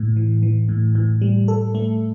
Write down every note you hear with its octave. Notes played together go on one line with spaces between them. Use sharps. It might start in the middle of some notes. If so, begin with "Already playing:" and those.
Already playing: A2
E3
E3
A2
A2
G3
A4
A3